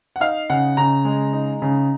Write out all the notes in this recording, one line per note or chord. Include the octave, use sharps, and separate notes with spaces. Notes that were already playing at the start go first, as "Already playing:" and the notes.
F#5
D#4 F5
C#3 F#5
C#3 A#5
G#3
D#4
C#3